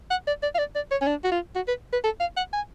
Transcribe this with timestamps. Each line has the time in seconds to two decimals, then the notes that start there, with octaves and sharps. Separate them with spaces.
0.11 F#5
0.27 D5
0.43 D5
0.55 F5
0.59 D5
0.76 D5
0.91 C#5
1.02 C#4
1.07 D4
1.24 F#4
1.31 F4
1.56 F#4
1.68 B4
1.93 B4
2.04 A4
2.20 F5
2.37 F#5
2.53 G#5